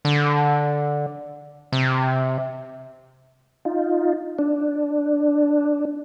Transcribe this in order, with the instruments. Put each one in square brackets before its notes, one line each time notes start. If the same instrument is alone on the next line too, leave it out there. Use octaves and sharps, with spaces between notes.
[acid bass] D3
C3
[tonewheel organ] D#4 F4
D4